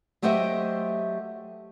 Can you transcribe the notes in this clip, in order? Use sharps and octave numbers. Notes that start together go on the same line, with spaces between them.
F#3 A3 G4 C5 D#5 E5